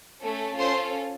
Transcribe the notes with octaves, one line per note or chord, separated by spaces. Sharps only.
A3 C#4 A4
C#4 F4 A4 C5 C6